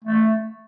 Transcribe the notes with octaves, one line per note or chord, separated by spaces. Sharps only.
A3